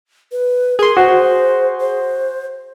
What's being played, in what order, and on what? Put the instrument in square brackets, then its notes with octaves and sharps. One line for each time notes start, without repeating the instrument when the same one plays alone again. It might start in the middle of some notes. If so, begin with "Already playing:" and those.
[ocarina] B4
[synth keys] G#4 C6 [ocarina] A#4
[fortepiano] F#4 [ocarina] C5
[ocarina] C5